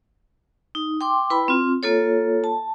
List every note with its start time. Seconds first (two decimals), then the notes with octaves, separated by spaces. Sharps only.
0.75 D#4
1.01 G5 C6 D6
1.30 E4 B4 G5 B5
1.48 C4 F4
1.83 A#3 F4 A4 C#5
2.44 A5